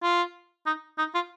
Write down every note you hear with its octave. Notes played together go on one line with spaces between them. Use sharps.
F4
D#4
D#4
F4